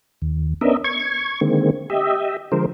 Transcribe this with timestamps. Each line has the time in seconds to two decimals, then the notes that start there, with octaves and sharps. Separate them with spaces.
0.22 D#2
0.61 B3 C#4 D4 A#4 D#5 E5
0.84 C#6 G#6
1.41 D3 D#3 G#3 A#3 C4
1.90 G4 D#5 E5
2.52 D3 F3 G#3 A#4 C5